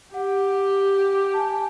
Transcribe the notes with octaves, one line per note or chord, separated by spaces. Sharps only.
G4 F#5
A5
G#5
A5